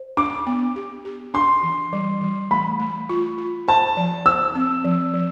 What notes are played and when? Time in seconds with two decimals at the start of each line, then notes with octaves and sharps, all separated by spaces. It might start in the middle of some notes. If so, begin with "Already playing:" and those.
Already playing: C5
0.17 D4 D6
0.47 B3
0.76 G4
1.05 G4
1.34 D4 C6
1.63 E3
1.93 G3
2.21 E3
2.51 A3 B5
2.80 A3
3.09 F4
3.38 F4
3.68 C5 A5
3.97 F3
4.26 C5 E6
4.55 C4
4.84 F3
5.14 F3